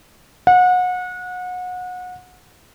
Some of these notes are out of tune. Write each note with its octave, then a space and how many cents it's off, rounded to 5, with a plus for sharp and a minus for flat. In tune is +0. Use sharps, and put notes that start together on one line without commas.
F#5 -30